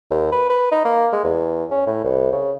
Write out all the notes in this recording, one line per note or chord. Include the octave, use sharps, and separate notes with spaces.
D#2
B4
B4
D#4
A#3
G#3
E2
C#4
A2
C2
C#3